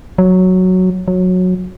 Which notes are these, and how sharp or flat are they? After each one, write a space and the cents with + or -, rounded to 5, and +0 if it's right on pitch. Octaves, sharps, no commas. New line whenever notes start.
F#3 +0
F#3 -15